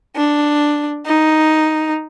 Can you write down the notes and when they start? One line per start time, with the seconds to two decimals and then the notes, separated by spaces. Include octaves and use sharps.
0.16 D4
1.06 D#4